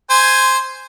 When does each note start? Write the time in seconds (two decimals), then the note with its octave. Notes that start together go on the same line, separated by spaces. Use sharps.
0.10 C5 G#5